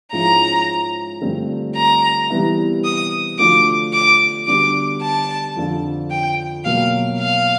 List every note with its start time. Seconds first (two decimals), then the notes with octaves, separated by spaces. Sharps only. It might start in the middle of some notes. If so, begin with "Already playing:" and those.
0.12 G#2 F3 G#3 C#4 E4 A#5
1.21 G2 D3 F3 A3 C4
1.76 A#5
2.30 C3 E3 G3 B3 E4
2.85 D#6
3.39 D3 F3 A3 D4 F#4 D6
3.93 D6
4.47 D3 G3 B3 D4 F#4 D6
5.02 A5
5.56 F2 D3 F3
6.10 G5
6.65 B2 F#3 A#3 F5
7.19 F5